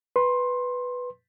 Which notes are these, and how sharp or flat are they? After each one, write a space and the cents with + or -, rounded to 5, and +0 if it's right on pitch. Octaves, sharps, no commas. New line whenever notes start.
B4 +0 C6 +20